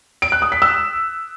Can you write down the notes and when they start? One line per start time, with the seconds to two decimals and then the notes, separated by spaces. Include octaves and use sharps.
0.22 D7
0.32 F#6
0.42 D#6
0.52 B6
0.62 E6